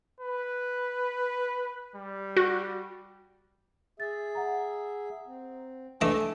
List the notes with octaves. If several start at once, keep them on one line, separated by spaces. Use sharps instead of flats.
B4
G3
F#4
G#4 E5 A6
F#5 A#5
C4
E3 A3 D4 D#5 G#5 A5